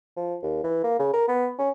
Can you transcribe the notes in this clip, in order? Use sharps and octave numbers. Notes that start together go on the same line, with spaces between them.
F3
D#2
E3
A#3
C#3
A#4
B3
C#4